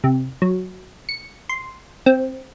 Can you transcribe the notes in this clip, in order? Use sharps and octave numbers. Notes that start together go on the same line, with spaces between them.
C3
F#3
C#7
C6
C4